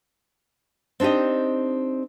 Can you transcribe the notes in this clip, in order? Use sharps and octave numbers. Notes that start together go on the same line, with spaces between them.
C4 D4 D#4 G4 D#5